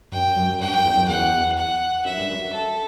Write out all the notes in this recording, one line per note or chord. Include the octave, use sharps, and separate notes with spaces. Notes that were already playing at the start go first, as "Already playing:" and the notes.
F#2 G5
F#2
G2 G5
F#2
E2
F#2
E2 F#5
F#5
F#2 E5
G2
F#2
A4